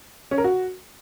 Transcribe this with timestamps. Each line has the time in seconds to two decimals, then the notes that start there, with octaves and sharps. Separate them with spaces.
0.31 C#4
0.38 A#4
0.44 F#4